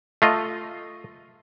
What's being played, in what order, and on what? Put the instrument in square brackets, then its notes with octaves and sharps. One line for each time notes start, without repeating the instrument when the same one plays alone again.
[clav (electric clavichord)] A3 F4 D#5